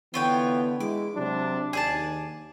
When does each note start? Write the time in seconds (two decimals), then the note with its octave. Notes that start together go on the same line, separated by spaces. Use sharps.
0.14 D3 E3 B3 F4 C#5 G5
0.80 G#3 E4 D6
1.16 C3 F#3 D4
1.73 D#2 G#4 D5 A5